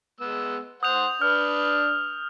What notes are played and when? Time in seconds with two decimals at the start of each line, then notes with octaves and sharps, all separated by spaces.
0.20 G#3 B3 E6
0.83 C5 F#5 D#6 G6 F7
1.22 D4 B4 F6